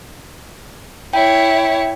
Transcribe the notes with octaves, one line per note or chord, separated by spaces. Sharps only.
E4 C#5 G5